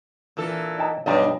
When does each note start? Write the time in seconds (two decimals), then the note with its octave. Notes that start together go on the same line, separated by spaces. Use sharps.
0.37 A#2 E3 A4
0.78 D#4 G5 A5
1.06 B1 G2 B3 D5 D#5